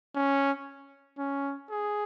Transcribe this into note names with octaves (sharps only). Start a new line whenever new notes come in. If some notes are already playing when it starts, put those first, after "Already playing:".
C#4
C#4
G#4